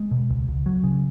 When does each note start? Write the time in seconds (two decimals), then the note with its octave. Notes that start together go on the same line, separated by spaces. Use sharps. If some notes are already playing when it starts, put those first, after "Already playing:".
Already playing: G#3
0.11 B2
0.30 C#2
0.48 C#2
0.66 F#3
0.84 C#3